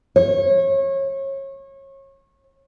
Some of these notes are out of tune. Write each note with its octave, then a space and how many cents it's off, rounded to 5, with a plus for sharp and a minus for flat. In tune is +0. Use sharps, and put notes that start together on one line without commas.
C#5 -30